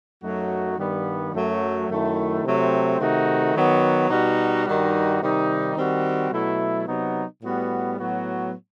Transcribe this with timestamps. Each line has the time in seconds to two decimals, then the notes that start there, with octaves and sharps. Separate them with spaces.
0.23 F#2 F#3 A3 D#4 F#4
0.78 G2 D#3 G3 B3
1.34 F#2 F#3 A3
1.89 F#2 D#3 A3 E4
2.44 C3 F#3 A3 C4
3.00 C3 D#3 A3 D#4 F#4
3.55 D#3 F#3 B3
4.10 B2 G3 D#4 F#4
4.66 G2 D#3 G3 D#4 F#4
5.21 C3 D#3 G3 D#4
5.76 D#3 G3 C4 F#4
6.32 B2 F#3 A3 E4
6.87 C3 F#3 B3 D#4
7.42 A2 G3 B3 F#4
7.98 A2 F#3 B3 F#4